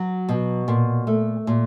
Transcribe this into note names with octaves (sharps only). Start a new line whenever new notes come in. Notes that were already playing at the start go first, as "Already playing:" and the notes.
Already playing: F#3
B2
A#2
A3
A#2